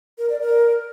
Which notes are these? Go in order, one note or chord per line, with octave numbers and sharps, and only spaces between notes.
A#4
D5
A#4